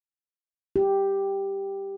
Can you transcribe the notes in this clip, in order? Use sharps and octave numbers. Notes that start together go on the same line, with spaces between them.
G4